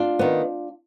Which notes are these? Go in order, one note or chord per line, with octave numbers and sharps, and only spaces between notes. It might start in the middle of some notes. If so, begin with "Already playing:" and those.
Already playing: D4 F4
D#3 B3